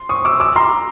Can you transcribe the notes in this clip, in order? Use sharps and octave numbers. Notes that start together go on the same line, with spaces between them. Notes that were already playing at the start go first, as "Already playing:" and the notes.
Already playing: C6
C#6 D#6
D6 E6
D6 E6
A#5 C6